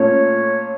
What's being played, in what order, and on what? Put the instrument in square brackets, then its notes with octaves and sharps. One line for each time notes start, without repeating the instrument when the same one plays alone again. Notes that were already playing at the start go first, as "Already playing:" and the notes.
Already playing: [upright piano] A#2 A3 C#4 F4 [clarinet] C#5